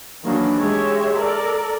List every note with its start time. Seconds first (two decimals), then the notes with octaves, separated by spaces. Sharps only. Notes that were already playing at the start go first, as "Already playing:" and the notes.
0.23 D#3 E3 F#3 A#3 D4
0.55 G#3 G4 C#5 E5
1.16 A4 A#4 D5